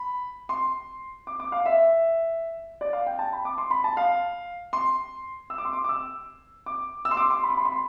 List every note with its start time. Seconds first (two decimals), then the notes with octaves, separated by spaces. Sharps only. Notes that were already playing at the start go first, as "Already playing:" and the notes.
Already playing: B5
0.49 C6
1.27 D6
1.40 D6
1.52 F5
1.66 E5
2.81 D5
2.93 F5
3.07 G5
3.19 A5
3.33 B5
3.45 D6
3.58 C6
3.71 B5
3.84 A5
3.97 F5
4.73 C6
5.50 E6
5.58 D6
5.65 C6
5.73 D6
5.84 D6
5.89 E6
6.66 D6
7.05 E6
7.11 C6
7.17 D6
7.30 C6
7.43 B5
7.50 C6
7.57 B5
7.65 C6
7.72 B5